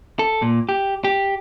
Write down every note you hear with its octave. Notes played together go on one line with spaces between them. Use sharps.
A4
A#2
G4
G4